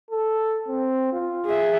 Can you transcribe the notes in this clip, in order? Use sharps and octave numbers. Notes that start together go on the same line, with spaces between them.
A4
C4
F4
G#4 E5